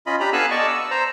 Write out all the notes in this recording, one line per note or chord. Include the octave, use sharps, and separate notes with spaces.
C#4 F4 D#5 B5
D4 G4 A#5 B5
B3 A4 F5 G#5 E6 F#6
D5 D#5 A5 C#6
E6
C5 A#5